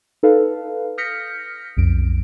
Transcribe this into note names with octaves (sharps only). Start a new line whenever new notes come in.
D#4 A4 B4 F5
D#6 F6 G6 A#6 B6 C#7
B1 F2 D7